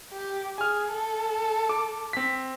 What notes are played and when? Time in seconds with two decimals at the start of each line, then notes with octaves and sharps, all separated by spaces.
0.12 G4
0.58 G#4 G#5 F6
0.92 A4
1.69 D6
2.13 C4 B6